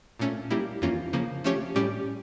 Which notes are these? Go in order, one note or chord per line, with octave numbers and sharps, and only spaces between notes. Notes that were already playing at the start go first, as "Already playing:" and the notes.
A#2 A3 C#4
G3 A#3 E4 G4
F2 E3 A#3 C#4 F4
C#3 F3 A#3
F3 A3 C#4 G4 C#5
A2 G3 C#4 G4 D5